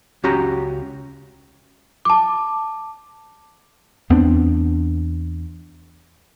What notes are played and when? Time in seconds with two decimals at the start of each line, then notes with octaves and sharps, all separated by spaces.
0.24 C#2 C#4 F#4 G4 A#5
2.05 A5 D6
4.10 E2 B3 C4 D4